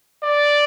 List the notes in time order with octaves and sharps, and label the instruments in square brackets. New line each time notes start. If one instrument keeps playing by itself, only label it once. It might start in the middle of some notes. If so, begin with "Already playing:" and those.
[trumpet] D5